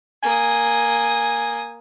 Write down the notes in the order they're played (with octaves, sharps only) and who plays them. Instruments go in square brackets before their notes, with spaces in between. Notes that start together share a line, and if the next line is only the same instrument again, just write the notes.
[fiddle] A#3 D#6 [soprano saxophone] G#5